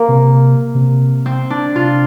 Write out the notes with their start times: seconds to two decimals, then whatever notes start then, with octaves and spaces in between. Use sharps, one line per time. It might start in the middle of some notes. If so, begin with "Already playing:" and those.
Already playing: A#3
0.08 C3
0.75 C3
1.26 C4
1.50 D4
1.75 C3 F4